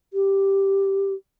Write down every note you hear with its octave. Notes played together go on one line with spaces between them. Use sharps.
G4